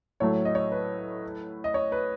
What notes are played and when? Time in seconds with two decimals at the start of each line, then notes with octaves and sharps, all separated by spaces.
0.20 A2 F#3 A3 C#5
0.45 D#5
0.55 C#5
0.72 B4
1.64 D#5
1.74 C#5
1.92 B4